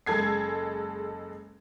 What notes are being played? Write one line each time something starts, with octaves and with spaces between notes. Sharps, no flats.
F#1 G#3 A4 G#6 C7